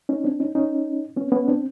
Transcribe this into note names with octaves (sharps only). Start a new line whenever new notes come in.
C#4 D#4
C4 D4
C#4 D#4
C#4 D#4
B3 C#4
B3 C#4
C4 D4